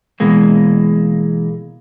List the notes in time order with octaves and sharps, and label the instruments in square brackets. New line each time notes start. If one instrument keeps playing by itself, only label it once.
[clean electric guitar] B2 E3 G#3 A#3